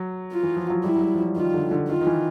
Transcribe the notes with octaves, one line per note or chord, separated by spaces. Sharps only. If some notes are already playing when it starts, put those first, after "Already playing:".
Already playing: F#3
F4
E3
F3
F#3
G3 E4
F#3
G3
F3
F#3
D#3 F4
D3
D3
D#3 F4
D#3
E3